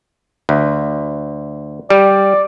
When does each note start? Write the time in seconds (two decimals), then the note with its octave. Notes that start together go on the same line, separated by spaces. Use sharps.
0.49 D2
1.90 G3 D5